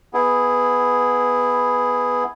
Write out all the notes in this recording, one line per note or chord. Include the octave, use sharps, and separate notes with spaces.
B3 E4 G#4